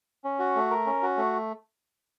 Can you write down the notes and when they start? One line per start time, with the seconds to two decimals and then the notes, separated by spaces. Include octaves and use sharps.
0.24 C#4
0.39 F#4
0.56 A3
0.70 A#4
0.86 C#4
1.03 F#4
1.17 A3